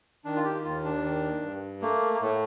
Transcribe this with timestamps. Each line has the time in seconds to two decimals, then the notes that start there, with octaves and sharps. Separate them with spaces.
0.25 D#3 D4
0.36 F4
0.44 G4
0.64 D#2 F4
0.84 D4
1.03 D#3
1.42 G2
1.81 A3 A#3
2.14 A#3
2.21 A2 A3